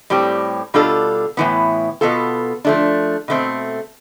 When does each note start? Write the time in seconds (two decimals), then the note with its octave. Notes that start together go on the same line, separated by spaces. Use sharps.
0.10 A2 G3 C4 G4
0.74 B2 G3 D4 F4 A4
1.37 A2 E3 B3
2.01 B2 B3 F4 A4
2.65 F3 A3 D4
3.28 B2 A3 C4